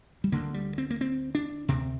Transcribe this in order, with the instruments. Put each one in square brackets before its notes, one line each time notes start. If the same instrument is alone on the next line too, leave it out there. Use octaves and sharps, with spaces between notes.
[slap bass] G3
D2 D3 A#3
G3
C4
A#3
C4
D4
D2 C3 C4